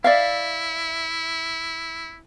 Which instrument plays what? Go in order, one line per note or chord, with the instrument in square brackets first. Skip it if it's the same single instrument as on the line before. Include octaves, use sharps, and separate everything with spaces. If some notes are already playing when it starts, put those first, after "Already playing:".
[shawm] E4 [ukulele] D5 E5 F5